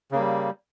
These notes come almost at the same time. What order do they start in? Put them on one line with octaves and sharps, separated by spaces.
C#3 A#3 G3